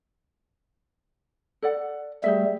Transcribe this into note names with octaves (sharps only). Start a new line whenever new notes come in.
A4 D5 F#5
G3 A3 G4 G#4 E5